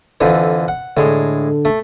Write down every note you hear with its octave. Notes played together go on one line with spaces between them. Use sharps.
F2 D3 E3
F#5
A2 D3 G#3
A3